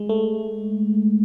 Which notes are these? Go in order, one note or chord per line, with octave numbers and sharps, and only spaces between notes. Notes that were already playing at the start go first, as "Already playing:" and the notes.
Already playing: G#3
A3